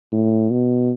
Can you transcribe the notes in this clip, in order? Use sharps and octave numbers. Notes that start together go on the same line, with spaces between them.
A2
B2